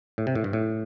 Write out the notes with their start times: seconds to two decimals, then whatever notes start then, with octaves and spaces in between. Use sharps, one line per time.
0.18 A2
0.27 C3
0.35 A2
0.44 G2
0.53 A2